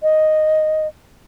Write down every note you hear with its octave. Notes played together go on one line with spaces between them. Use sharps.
D#5